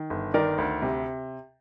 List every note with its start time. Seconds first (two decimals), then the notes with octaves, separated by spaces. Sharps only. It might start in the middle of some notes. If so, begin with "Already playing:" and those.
Already playing: D#3
0.10 G1
0.34 D#3 A#4 D5
0.58 D2
0.82 C3